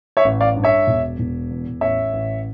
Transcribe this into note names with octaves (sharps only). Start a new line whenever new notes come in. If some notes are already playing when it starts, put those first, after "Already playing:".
C#5 E5
A1
D5 F5
G2
C#5 E5
E1
E1
E2
A1 C#5 E5
A1